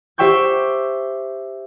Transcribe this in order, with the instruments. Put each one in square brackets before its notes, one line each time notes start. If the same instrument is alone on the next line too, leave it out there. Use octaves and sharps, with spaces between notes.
[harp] G4 C5 E5 G5 C#6 G6